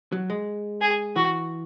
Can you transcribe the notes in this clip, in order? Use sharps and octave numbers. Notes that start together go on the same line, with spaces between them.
F#3
G#3
G#4
E3 F#4